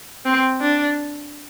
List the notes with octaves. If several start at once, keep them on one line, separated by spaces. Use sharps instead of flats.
C4
D4